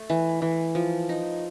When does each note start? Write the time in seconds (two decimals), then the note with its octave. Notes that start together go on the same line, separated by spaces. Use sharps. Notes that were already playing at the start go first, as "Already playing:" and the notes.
Already playing: A3
0.10 E3
0.42 E3
0.75 F3
1.09 D#4